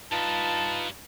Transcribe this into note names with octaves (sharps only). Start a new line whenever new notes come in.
G2 D#4 F4 B4 A5